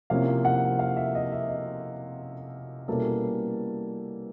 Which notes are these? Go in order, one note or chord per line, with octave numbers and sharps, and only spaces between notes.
C3 F3 A#3 C#4 E4 F5
F#5
F5
E5
D#5
E5
D#5
B2 G3 A#3 C#4 E4 A4